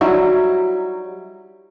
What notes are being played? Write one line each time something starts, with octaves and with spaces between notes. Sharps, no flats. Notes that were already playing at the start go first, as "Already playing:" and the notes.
F#3 G3 D#4 E4 F#4